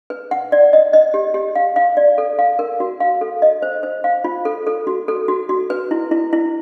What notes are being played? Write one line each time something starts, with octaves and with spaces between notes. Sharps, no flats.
B4
F#5
D5
D#5
D#5
G4
G4
F5
F5
D5
A4
F5
A#4
F#4
F5
A4
D#5
C5
C5
F5
F4
A4
A4
F#4
A4
F#4
F#4
B4
E4
E4
E4